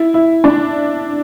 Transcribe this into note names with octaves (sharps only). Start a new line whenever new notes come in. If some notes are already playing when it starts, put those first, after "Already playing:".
Already playing: E4
E4
D4